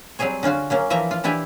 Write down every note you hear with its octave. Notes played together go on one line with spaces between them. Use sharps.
F#3 G3 C4 G#4 C#5
D3 C#4 F4 F#4
F#3 A#3 C#4
E3 F3 A#3 E5 A#5
F4
E3 D4 E4 G4 D5 G#5